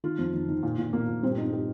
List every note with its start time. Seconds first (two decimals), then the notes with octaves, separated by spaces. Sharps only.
0.04 D#3 F4
0.18 F2
0.33 D#3
0.49 D#3
0.63 A#2
0.78 A#2
0.93 A#2 A#3
1.08 A#2
1.23 G2 C4
1.38 G2 D#4
1.53 G4